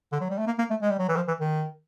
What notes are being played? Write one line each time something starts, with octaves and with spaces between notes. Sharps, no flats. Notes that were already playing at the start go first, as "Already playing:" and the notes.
D3
F#3
G3
A3
A#3
A#3
A3
G#3
G3
F#3
E3
F3
E3
D#3